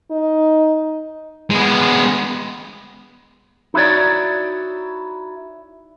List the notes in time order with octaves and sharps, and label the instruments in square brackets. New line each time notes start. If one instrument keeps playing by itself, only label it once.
[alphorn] D#4
[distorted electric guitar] G#3 B3
[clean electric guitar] D#4 E4 F#4 C#5 D5